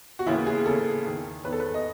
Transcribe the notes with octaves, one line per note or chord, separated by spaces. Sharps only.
F#4
D#2 C#3 E3 E4
G#4
D#2 C#3 E3 A4
E2 D#3
E2 D#3 B4
A4
B4
D#5